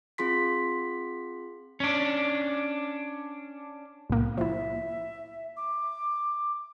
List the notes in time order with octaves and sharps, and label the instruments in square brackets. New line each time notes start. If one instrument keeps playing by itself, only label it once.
[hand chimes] C4 F4 G#4 C6 B6
[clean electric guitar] C#4 D4
[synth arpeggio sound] C2 A2 A#3
[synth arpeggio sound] F3 E4 [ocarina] E5
[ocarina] D6